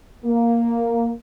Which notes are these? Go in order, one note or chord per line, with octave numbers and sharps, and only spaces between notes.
A#3